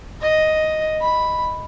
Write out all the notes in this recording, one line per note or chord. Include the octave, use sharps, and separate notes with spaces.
D#5
B5